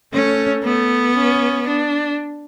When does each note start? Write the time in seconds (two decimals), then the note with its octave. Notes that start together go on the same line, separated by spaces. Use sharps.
0.13 A3 C#4
0.64 A3 B3
1.15 C#4
1.67 D4